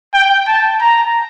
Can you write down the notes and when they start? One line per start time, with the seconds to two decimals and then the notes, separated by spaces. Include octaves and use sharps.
0.14 G5
0.48 A5
0.81 A#5